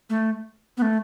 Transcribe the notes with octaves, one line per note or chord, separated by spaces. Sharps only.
A3
B3
A3